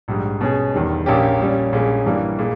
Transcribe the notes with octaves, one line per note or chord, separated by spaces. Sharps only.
A#1 G#2 G3
B2 G#3 C#4 G#4
E2 D#3 G3
A#1 A#2 A#3 C#4 G4
A#2 G3 C#4
A#1 A#2 G#3 C#4
G2 E3 G3 A#3
A#2 G#3